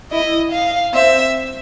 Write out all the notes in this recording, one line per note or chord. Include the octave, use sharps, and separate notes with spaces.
E4 D#5
F5
C4 E5